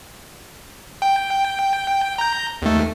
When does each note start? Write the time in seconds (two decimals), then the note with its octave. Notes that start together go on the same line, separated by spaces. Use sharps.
1.02 G5
2.18 A#5 G6
2.62 D#2 A3